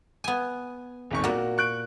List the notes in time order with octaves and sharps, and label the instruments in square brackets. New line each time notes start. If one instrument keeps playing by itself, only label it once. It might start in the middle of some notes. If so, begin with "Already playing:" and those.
[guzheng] B3 G#5
[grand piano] D#1 G#1 C#6
[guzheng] A#2 A#3 [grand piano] F#4
[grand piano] C#6 F#6 D7